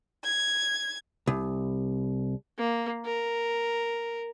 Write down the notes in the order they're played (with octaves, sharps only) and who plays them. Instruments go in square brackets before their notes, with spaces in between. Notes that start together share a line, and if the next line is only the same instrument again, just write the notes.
[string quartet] G#6
[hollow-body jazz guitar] C2
[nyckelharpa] A#3
A#4